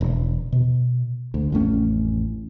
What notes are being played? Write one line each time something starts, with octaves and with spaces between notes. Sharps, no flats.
E1
B2
D2
A1 F2 A3 C#4